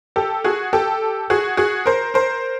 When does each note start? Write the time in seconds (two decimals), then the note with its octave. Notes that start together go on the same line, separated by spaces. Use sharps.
0.16 G4 A4
0.44 F#4 G#4
0.73 G4 A4
1.30 F#4 G#4
1.57 F#4 G#4
1.86 A#4 C5
2.14 A#4 C5